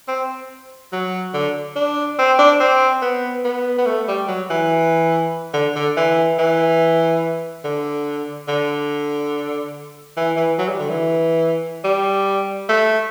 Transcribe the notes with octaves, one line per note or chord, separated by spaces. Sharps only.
C4
F#3
D3
D4
C4
D4
C4
B3
B3
B3
A3
G3
F#3
E3
D3
D3
E3
E3
D3
D3
E3
E3
F#3
G3
D3
E3
G3
A3